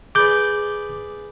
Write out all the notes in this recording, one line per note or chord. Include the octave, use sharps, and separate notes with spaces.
G#4 B4 D5 D6 G6